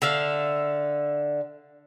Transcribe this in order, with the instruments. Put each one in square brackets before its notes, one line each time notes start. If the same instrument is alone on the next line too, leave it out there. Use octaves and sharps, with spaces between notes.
[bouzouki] D3 E5 F5